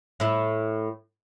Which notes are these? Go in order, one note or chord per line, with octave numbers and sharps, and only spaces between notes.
A2 E4